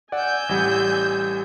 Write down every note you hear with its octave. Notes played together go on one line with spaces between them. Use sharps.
D5 F#5 G#5 E6 G6
A1 G3